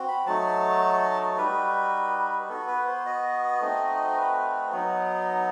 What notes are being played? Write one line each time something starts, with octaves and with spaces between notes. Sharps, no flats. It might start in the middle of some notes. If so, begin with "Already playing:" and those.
Already playing: C4 F#4
B5
F#3 A3 D#4 F#4 A5
G3 D#4 F#4 B4
B3 F#4 A4
B4
C5
D#5
A3 C4 D#4 F#4
B4
F#3 B3 D#4